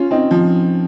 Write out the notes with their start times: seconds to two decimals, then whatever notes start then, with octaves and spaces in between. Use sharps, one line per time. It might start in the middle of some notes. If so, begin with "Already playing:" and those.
Already playing: C#4 F4
0.11 C4 D#4
0.31 F3